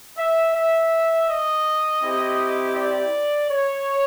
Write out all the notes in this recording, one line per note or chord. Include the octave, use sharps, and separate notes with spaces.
E5
E5
D#5
C4 E4 G4
D5
C#5